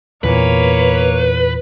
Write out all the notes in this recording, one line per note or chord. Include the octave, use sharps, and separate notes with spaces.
E2 A#2 A#3 B4 C#5